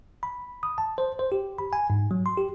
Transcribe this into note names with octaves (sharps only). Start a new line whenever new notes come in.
B5
D#6
A5
C5
C5
G4
B5
G#5
G#2
F#3
C6
G4